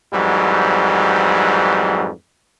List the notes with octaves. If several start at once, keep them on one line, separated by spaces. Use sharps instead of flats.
F2 G#2 E3 F#3 G3